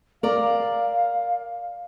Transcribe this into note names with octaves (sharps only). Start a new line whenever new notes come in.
A#4 D5 F5